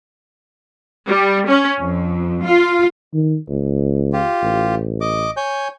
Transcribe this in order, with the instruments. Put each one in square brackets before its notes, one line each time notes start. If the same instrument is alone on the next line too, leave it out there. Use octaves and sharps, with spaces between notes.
[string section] G3
C#4
F2
F4
[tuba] D#3
C#2
[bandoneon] F4 G4
[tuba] A1
[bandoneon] D#5 D6
C#5 G#5 G6